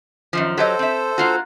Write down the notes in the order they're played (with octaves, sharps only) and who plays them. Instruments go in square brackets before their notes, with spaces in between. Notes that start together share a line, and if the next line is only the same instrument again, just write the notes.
[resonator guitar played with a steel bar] F#2 D#3 F3
[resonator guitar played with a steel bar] F#3 G4 D#5 [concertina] A4 C5
[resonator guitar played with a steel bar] C4 E5
A#3 F4 F#4